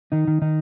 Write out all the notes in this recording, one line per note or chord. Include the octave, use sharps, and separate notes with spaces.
D#3 D#4
D#3
D#3 D#4